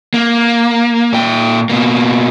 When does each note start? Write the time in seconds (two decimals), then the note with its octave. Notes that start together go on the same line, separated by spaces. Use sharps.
0.14 A#3
1.13 A#2 G5
1.70 B2 A#3